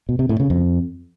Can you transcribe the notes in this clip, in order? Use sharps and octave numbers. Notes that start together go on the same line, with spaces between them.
B2
C3
A2
C#3
F2